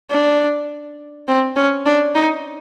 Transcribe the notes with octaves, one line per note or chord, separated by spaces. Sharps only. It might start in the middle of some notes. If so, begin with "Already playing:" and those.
D4
C4
C#4
D4
D#4